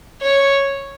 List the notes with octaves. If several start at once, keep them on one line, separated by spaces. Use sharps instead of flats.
C#5